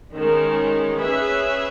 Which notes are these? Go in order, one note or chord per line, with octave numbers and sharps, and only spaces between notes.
D#3 G#3 C#4
C#4 G#4 B4 E5